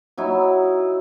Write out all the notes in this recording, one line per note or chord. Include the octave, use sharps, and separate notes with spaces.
F#3 D#4 E4